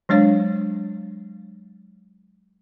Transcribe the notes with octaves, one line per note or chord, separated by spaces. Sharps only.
F#3 G#3 D4 C#5 F5